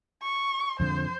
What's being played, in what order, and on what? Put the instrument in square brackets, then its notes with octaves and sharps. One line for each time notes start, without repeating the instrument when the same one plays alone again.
[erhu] C#6
[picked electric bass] F2 D3 [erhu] C5